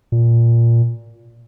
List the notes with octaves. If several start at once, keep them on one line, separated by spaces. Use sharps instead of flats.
A#2